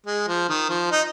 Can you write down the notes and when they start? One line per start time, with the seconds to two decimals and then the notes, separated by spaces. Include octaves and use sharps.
0.06 G#3
0.27 F3
0.49 D#3
0.70 F3
0.91 D#4